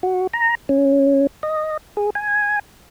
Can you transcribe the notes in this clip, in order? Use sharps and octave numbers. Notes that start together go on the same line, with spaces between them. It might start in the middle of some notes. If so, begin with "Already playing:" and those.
F#4
A#5
C#4
D#5
G#4
G#5